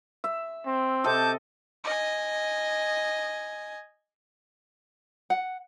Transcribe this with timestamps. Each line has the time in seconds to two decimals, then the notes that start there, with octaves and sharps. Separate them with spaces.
0.24 E5
0.66 C4
1.04 C3 A4 D#5 A5 D6 G6
1.84 D#5 G#5
5.30 F#5